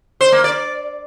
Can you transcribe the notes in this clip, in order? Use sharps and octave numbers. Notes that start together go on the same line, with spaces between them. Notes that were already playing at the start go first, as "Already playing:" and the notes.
C5
A#3
D5